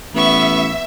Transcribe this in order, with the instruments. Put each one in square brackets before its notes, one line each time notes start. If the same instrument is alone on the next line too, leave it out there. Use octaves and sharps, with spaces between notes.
[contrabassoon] A1 [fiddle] B3 C#6 [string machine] E5